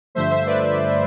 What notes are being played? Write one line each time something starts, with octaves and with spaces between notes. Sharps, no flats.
G2 D3 F3 A3 C5 E5
C5 E5
B4 D5